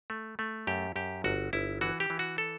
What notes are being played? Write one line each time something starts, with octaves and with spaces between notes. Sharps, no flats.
A3
A3
F#2 G4
F#2 G4
G1 F#4
G1 E4
E3 F#4
G4
E3
F#4
A4